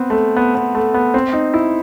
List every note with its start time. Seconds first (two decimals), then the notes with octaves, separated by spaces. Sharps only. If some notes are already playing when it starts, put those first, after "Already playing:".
Already playing: B3 C4
0.10 A3
0.36 B3
0.55 B3
0.75 A3
0.94 B3
1.14 C4
1.33 D#4
1.54 E4